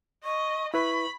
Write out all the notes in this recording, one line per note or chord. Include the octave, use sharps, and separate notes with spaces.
D#5 C#6
E4 B4 B5 C#6